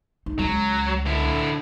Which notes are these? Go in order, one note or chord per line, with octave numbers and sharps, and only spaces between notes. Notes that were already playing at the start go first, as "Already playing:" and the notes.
D#4
C#2 F#3
D3 E4